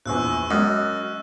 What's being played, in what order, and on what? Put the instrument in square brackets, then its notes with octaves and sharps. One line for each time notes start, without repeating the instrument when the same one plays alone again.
[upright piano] A#1 E2 [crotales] C#6 E6 F#6
[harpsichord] F#2 [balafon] G#3 B3 [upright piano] D#5